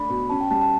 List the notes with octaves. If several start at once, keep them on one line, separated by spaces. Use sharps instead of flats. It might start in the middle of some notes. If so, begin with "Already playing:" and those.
Already playing: A3 D4 B5
B2
C#4 A5
G5
G3 A5
A5